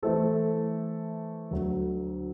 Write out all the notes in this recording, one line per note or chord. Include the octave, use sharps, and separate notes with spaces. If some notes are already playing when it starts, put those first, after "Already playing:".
E3 A3 E4 A4 C5
D2 D3 F#3